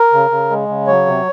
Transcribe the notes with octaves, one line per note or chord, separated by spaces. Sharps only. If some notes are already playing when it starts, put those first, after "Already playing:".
Already playing: A#4
C#3
C#3
G#3
C#3
F#3 C#5
C3